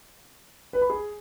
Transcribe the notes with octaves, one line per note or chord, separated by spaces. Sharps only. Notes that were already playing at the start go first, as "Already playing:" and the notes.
B4
B5
G#4